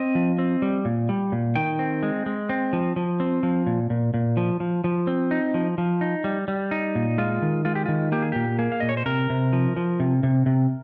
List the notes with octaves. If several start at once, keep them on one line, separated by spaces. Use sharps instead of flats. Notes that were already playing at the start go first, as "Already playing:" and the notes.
Already playing: C4 D#5
F3
C4
G3
A#2
G3
A#2
D#3 G5
C4
G#3
G#3
C4
F3
F3
C4
F3
A#2
A#2
A#2
F3
F3
F3
C4
D#4
F3
F3
D#4
G3
G3
D#4
A#2
G#3 F4
D#3
G#3 F4
G4
D#3 F4
A#3 G4
G#4
A#2 G4
A#3 G#4
F5
A#2 D#5
C#5
C5
C3 A#4
C3
F3
F3
C3
C3
C3